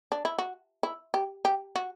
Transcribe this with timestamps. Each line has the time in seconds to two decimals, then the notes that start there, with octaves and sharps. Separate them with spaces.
0.12 D4
0.25 E4
0.38 F#4
0.83 E4
1.14 G4
1.45 G4
1.76 F#4